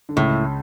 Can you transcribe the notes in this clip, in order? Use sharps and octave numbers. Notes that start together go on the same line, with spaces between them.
D3
C#2 A2 C#3